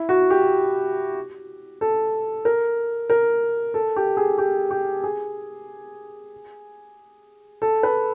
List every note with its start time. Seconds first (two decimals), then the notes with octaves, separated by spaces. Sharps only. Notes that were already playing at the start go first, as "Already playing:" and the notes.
Already playing: E4
0.09 F#4
0.30 G4
1.81 A4
2.45 A#4
3.10 A#4
3.74 A4
3.96 G4
4.17 G#4
4.38 G4
4.71 G4
5.04 G#4
7.62 A4
7.83 B4